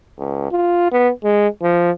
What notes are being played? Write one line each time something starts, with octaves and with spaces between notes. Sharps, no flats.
C#2
F4
B3
G#3
F3